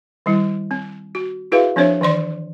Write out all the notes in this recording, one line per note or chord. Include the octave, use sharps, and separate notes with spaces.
D#3 G3 E4
C4
F#4
E4 F#4 G#4 B4 E5 F5
F3 C4 D4 C5 C#5 E5
D#3 E3 D5 C6